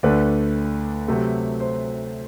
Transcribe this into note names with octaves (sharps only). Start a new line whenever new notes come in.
D2 D3 A3 D4 B4
C3 F#3 A3
C5